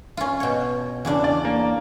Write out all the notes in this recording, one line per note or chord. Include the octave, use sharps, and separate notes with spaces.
C#4 F4
B2 C#5
E2 C#3 D4
D5
A#3